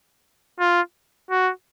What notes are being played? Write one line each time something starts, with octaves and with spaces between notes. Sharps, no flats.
F4
F#4